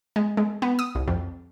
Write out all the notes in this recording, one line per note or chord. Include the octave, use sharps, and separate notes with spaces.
G#3
G#3
B3
D#6
C2
F2